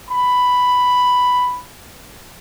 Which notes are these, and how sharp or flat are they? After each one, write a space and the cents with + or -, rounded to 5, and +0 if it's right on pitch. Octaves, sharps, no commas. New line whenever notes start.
B5 +5